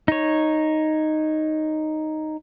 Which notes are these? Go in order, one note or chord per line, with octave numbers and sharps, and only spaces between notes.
D#4 C#5